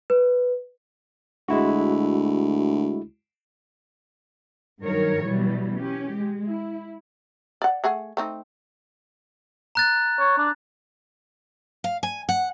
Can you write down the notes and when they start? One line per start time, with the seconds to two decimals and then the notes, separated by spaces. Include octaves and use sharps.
0.10 B4
1.48 D2 G#3 E4 F#4
4.80 G2 D#3 F#3 A#4 C#5
5.23 B2 E3 F#3 G3
5.78 C#4 G4
6.13 G#3
6.47 E4
7.62 D5 F#5
7.84 A3 G#4 F#5
8.17 A3 C4 D#4
9.75 A#5 F#6 A6
10.19 C#5
10.38 D4
11.84 F5
12.03 G#5
12.29 F#5